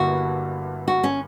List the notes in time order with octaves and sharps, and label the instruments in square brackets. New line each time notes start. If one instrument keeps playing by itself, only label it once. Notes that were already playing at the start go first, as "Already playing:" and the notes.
Already playing: [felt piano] G1 G2 D3 A#3 E4 [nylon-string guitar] F#4
[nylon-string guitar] F#4
C#4